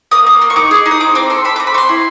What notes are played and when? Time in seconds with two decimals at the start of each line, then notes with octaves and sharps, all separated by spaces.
0.11 A#3 D#6
0.27 A#3
0.41 A#3
0.50 C#6
0.56 D#4 D6
0.71 G#4
0.86 D#4
0.91 D#6
1.00 C4 D6
1.15 C4 D6
1.30 A4 C6
1.45 A4 B5
1.56 D6
1.60 C4
1.67 B5
1.74 C4 C6 C#6
1.89 E4